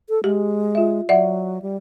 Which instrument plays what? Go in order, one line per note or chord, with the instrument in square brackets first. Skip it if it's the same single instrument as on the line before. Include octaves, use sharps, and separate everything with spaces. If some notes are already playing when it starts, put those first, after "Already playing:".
[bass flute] A4
[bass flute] G#3 [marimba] G4
[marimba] F4 E5
[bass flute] F#3 [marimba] D5 E5 F#5
[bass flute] G3